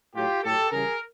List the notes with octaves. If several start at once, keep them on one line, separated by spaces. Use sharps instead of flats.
A2 F#3 F4 G4
A2 F#3 G4 A4
C#3 E3 G3 G#4 A#4